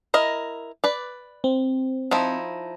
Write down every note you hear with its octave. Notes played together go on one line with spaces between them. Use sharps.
E4 A#4 D#5
B4 D5
C4
F3 D#4 E4